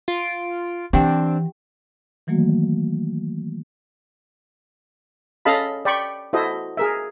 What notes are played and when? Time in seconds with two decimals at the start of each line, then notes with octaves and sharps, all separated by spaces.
0.08 F4 D7
0.93 E3 C4 D4 G4 F#5 G5
2.27 D#3 E3 F#3 A3 A#3 F#4
5.45 C#4 A4 D#5 F5 A5 B5
5.85 D5 G5 B5 C#6
6.33 E4 F#4 A4 C5 D#5
6.77 G#4 A#4 E5